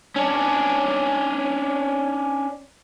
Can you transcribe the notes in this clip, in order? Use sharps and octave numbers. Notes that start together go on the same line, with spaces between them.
C#4 D4